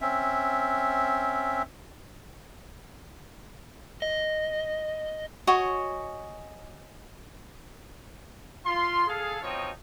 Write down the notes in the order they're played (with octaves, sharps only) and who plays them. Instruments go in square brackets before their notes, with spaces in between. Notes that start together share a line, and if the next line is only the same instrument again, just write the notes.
[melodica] C4 C#4 E5
[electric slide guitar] D#5
[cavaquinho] F#4 C#5 D#5 G#5
[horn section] F4 C6
G#4 A4 F5
B2 F3 C4 D#4 C#5 D#5